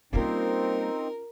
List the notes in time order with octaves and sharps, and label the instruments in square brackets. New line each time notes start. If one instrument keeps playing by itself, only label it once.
[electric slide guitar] G3 A#3 [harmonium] C4 D#4 [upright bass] C#4 F4 [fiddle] A#4